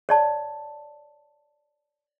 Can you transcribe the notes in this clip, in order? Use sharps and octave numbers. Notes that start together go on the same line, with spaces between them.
C#5 D5 A5